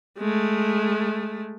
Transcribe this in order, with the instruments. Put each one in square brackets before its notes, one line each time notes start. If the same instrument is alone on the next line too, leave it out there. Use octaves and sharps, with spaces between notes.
[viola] G#3 A3